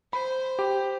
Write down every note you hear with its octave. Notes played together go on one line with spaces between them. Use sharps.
C5 B5
G4